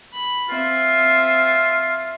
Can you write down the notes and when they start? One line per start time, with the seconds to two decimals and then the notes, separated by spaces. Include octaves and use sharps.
0.12 B5
0.49 C4 F4 E5